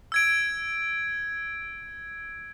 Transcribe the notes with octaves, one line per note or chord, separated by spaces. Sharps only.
E6 G#6 D7